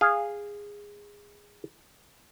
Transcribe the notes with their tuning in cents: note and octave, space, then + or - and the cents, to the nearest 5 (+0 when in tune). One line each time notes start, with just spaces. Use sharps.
G#4 -15 F5 +0